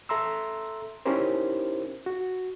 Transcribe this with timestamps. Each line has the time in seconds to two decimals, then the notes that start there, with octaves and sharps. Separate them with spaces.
0.09 A4 E5 A#5 C6 E6
1.05 C#4 D#4 E4 G4 A#4 C5
2.06 F#4